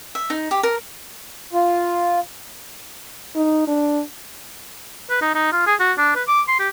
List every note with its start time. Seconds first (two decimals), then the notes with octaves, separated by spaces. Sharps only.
0.15 E5
0.30 D#4
0.51 G4
0.63 A#4
1.53 F4
3.35 D#4
3.67 D4
5.10 B4
5.22 D#4
5.35 D#4
5.52 F4
5.67 G#4
5.80 F#4
5.98 D4
6.15 B4
6.28 D6
6.48 C6
6.59 G4